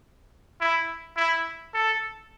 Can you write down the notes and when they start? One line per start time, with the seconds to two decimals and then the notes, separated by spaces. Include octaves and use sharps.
0.61 E4
1.17 E4
1.74 A4